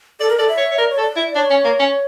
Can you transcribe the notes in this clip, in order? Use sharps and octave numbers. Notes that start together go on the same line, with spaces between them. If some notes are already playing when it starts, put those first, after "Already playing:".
A4 D5
A#4
A4 D5
E5
C#5
C#5
A#4 D5
C#5
A4
D5
E4
D4 C#5
C#4
A#3
C#4